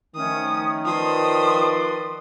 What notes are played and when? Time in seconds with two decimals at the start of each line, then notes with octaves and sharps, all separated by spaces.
0.16 D#3 F3 A3 C#4 D#6
0.86 F3 B4 D5 C6 D#6